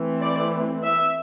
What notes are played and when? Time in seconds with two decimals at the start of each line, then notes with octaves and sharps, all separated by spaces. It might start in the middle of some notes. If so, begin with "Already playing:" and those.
Already playing: E3 A3 C4
0.21 D5
0.83 E5